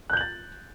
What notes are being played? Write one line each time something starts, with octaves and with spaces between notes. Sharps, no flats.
F#6 G6 A6 F#7